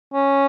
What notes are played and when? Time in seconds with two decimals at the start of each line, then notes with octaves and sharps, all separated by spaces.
0.13 C#4